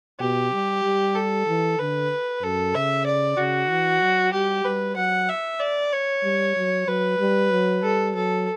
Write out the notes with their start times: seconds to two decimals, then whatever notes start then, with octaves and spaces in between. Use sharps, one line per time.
0.20 B2 G4
0.52 G3
0.83 G3
1.16 A4
1.47 E3
1.79 D3 B4
2.42 F#2 A4
2.75 C#3 E5
3.06 D5
3.37 C#3 F#4
3.70 E3
4.01 F#3
4.33 G3 G4
4.64 G3 B4
4.96 F#3 F#5
5.29 E5
5.60 D5
5.93 C#5
6.24 G3
6.56 F#3
6.87 F#3 B4
7.19 G3
7.51 F#3
7.82 G3 A4
8.15 F#3 A4